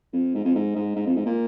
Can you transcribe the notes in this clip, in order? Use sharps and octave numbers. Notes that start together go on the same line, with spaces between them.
F2
G#2
F2
G#2
G#2
G#2
F2
G#2
A#2